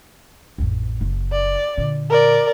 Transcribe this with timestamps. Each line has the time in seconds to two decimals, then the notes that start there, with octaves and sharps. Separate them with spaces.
0.58 A1 F2
1.01 F#1
1.32 D5
1.78 A#2 D3
2.10 A#4 D5